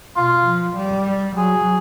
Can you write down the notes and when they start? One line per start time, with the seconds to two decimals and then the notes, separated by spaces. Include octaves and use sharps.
0.16 B2 F4
0.47 F3
0.77 G3
1.37 F#3 G#4